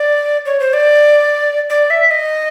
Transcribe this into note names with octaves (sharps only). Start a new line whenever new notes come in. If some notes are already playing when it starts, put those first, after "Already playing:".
Already playing: D5
C#5
C5
D5
D5
E5
D#5